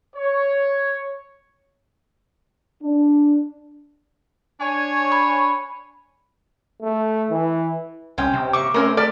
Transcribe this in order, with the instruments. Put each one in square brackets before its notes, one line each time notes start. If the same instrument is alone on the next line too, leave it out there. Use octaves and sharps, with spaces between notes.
[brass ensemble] C#5
[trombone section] D4
[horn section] D4 C#5 [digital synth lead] G#5
[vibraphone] B5 [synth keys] C#6
[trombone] A3
E3
[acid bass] C2 [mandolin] C4 G5 [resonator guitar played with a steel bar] C#4
[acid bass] C3
[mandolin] A#3 E5 C#6 [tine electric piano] D6
[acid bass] A3 [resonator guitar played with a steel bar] C4 C#4 A#4 [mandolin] C5
[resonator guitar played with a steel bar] A4 D5 [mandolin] B4 F6